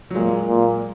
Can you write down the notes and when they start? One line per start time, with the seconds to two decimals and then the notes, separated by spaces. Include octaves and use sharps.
0.10 F#3
0.14 A#2 G#3
0.44 A#2